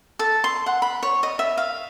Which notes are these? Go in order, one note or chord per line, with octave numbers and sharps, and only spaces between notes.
A4
C6
F#5
B5
C#5
D#5
E5
F5